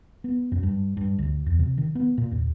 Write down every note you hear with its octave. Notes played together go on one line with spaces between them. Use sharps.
B3
F#2
G2
G2
D2
E2
C3
D#3
B3
A#2
D#2